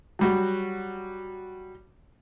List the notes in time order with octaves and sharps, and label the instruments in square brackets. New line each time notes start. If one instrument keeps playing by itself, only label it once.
[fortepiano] F#3 G3 F#4